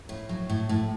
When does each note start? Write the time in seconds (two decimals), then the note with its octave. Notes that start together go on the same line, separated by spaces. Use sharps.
0.09 A2
0.29 F#3
0.50 A2
0.69 A2